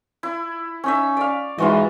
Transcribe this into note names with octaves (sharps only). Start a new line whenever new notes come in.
E4
C#4 D#4 E5
D5 F5
G#2 E3 F4 F#4 D#5